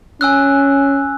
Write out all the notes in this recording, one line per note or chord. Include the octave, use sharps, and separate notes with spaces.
C#4 G#5 E6 F#6